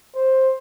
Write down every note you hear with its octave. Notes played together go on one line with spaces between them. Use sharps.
C5